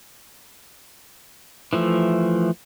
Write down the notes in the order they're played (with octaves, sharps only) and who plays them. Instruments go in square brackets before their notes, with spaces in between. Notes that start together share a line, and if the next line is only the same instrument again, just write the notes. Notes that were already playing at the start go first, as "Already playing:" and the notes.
[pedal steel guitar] E3 F3 A3